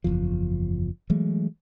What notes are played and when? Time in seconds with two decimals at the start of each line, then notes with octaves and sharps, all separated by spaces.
0.04 F#1 E2 F3
1.10 E3 F#3 G#3 A3